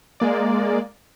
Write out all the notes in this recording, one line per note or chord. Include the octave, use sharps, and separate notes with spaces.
G#3 A#3 D5